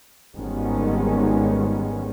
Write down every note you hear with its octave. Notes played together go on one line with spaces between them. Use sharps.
G#1 D#3 G3 G#3 B3 C#4